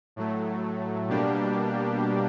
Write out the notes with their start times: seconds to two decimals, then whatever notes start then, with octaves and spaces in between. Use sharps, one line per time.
0.16 A2 F#3 A3
1.09 B2 G3 A#3 D4 G4